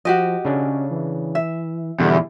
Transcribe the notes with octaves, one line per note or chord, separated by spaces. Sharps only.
F3 F#4 G4 D#5
C#3 C#4 D4
E3
E5
E2 B2 D3 G3 E4